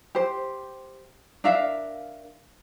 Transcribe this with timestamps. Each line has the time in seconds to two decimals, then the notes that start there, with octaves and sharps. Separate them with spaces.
0.15 G4 C5
1.44 D4 A#4 E5 F5